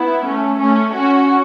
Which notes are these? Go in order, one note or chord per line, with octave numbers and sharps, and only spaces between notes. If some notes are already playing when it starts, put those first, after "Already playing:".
Already playing: B3 E4
A3 C#4
A3 C#4
C#4 F#4